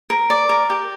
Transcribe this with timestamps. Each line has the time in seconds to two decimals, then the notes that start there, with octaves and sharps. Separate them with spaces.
0.10 A#4
0.30 D5
0.49 A#4
0.70 G4